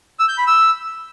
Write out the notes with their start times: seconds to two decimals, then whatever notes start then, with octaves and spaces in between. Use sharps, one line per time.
0.19 E6
0.29 G6
0.38 B5
0.47 E6